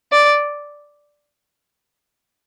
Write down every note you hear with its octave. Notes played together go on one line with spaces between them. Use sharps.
D5